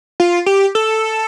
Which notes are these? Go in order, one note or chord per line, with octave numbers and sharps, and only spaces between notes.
F4
G4
A4